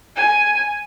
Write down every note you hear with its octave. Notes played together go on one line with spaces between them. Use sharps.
G#5